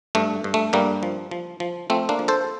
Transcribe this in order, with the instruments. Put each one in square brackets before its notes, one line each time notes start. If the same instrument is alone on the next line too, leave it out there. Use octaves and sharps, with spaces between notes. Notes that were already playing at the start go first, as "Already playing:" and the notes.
[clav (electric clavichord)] G2 A3
G2
A3
G2 G3 A#3
F3
F3
F3
F3 A3 C4
A#3 D4
F3
A4 C5